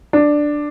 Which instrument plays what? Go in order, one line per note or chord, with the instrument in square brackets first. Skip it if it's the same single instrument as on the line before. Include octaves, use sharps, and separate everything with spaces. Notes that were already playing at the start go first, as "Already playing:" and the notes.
[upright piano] D4